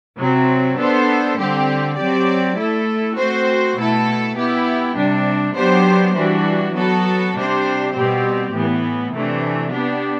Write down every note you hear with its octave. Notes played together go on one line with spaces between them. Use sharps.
C3 F#3 C4
B3 D4 A4 C5
D3 G3 C4 G4
F#3 C4 G4 D5
A3 E4 A4
A3 C4 F#4 C5
B2 A3 E4 A4
B3 E4 G4
C3 G3 D4
F#3 B3 D4 G4 C5
E3 G3 D4 F#4
F#3 B3 F#4 A4
C3 G3 D4 G4 C5
B2 G3 C4 G4
A2 E3 B3
C3 E3 A3 D4
B3 D4 G4